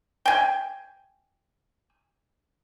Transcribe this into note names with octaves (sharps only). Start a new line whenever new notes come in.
G5 G#5